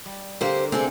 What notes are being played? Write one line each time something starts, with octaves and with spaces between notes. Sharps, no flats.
G3
D3 A#3 C4 G4 C5
C3 C4 G#4 A4